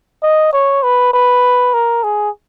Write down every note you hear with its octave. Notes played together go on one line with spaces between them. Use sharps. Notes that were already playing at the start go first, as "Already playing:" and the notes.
D#5
C#5
B4
B4
A#4
G#4